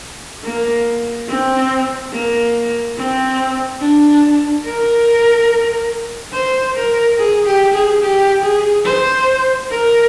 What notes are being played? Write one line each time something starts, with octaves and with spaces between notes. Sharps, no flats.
A#3
C4
A#3
C4
D4
A#4
C5
A#4
G#4
G4
G#4
G4
G#4
C5
A#4